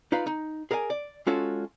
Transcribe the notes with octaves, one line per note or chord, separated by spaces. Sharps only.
D#4 F4 B4 D5 F5
D#4
G#4 A#4 D5 F5 G#5
D5
G#3 C#4 F4 F#4 A4 C#5